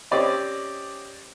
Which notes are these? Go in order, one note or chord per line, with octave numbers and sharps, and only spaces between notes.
C4 C#4 G4 D5 D#5